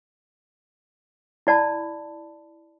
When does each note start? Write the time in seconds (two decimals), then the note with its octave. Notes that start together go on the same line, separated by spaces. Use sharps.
1.47 E4 D5 A5 B5